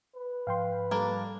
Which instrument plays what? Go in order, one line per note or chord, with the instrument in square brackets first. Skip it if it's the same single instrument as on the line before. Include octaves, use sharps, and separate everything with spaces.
[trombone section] B4
[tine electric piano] G#2 F3 [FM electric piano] F5 G5 C6
[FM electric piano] G3 A4 [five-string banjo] A#3 D4